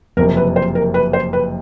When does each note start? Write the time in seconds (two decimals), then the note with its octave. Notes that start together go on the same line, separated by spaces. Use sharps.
0.17 F#1 F2 C3 A#4
0.37 B4
0.56 C5
0.75 A#4
0.94 B4
1.13 C5
1.33 B4